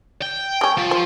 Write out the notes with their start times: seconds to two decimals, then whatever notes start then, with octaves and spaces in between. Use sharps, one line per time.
0.22 G5
0.61 G3 C#4
0.78 F3
0.91 C5